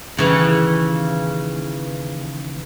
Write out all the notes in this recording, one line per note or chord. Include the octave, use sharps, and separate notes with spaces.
D#2 C#3 E3